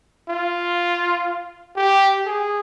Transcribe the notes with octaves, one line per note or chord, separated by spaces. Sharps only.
F4
G4
G#4